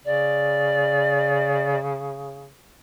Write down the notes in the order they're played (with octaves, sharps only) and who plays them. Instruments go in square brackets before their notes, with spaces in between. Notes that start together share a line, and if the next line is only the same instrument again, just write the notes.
[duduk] C#3 [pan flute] D5